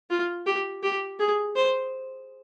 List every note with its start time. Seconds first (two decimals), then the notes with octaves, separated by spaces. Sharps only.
0.10 F4
0.46 G4
0.83 G4
1.20 G#4
1.56 C5